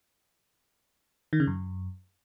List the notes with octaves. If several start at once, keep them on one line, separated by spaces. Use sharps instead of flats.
D#3
C#3
F#2